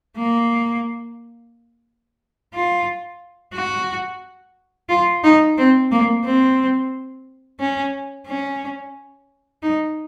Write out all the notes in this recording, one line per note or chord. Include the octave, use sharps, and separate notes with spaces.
A#3
F4
F#4
F4
D#4
C4
A#3
C4
C#4
C#4
D#4